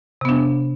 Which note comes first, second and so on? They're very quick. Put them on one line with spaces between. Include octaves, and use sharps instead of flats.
C3 B3 D4